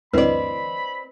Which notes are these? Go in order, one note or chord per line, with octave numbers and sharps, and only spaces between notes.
D2 G2 E3 C4 B4 D5 D#5 B5